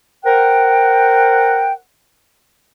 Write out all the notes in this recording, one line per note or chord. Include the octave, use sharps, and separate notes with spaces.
A#4 C5 F#5 G5